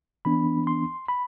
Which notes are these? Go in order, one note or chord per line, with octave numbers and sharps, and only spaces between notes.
E3 B3 D4 B5
C6
B5